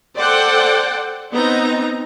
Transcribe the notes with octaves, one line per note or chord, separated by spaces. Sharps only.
A4 C5 D5 F#5 G5
B3 C4 D#4 A#5